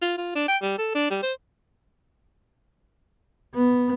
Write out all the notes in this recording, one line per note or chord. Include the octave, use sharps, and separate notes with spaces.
F4
F4
D4
G5
G3
A4
D4
G3
C5
B3